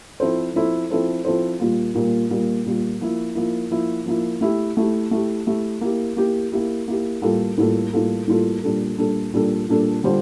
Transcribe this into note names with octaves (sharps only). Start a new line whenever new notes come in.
F3 C4 E4 A4 C5
F3 C4 E4 A4 C5
F3 C4 E4 A4 C5
F3 C4 E4 A4 C5
A#2 G3 A#3 F4
A#2 G3 A#3 F4
A#2 G3 A#3 F4
A#2 G3 A#3 F4
F3 A#3 E4
F3 A#3 E4
F3 A#3 E4
F3 A#3 E4
A3 E4 G4
A3 E4 G4
A3 E4 G4
A3 E4 G4
A#3 E4 G4
A#3 E4 G4
A#3 E4 G4
A#3 E4 G4
A2 G3 A#3 F4 A4
A2 G3 A#3 F4 A4
A2 G3 A#3 F4 A4
A2 G3 A#3 F4 A4
A#2 G3 D4 A4
A#2 G3 D4 A4
A#2 G3 D4 A4
A#2 G3 D4 A4
D3 G3 D4 F4 C5